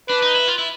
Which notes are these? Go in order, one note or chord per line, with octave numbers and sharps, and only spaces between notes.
D4 B4
D#4
E4
F4
E4